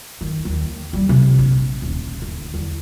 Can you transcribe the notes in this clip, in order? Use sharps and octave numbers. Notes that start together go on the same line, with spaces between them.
D#3
D#2
G3
C3
A#1
D#1
D2
E2